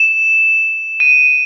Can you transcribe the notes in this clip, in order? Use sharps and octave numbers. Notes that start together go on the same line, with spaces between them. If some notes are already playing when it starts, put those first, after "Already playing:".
Already playing: E7
D#7